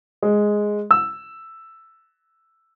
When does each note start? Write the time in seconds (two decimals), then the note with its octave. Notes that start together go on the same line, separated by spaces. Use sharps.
0.23 G#3
0.91 E6